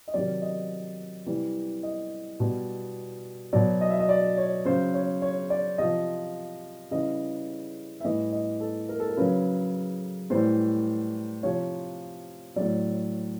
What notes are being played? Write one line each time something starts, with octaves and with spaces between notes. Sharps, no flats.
D#5
C3 D#3 F#3 D5
D#5
C3 E3 G3
D#5
B2 G3
B2 F#3 D5
D#5
E5
D#5
D5
C#5
C#3 F#3 C5
C#5
C#5
D5
C3 F3 D#5
C#3 E3 G3 D#5
E5
A2 E3 G3 D#5
D#5
A4
A#4
A4
A#4
C#3 F#3 B4
A2 E3 G3 C5
C3 F3 C#5
A2 F#3 D5